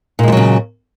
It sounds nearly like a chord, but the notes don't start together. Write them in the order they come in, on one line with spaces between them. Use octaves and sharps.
A#2 G#3 F3 F#3 C#3